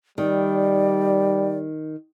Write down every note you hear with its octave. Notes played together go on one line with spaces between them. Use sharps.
D#3 G3 D5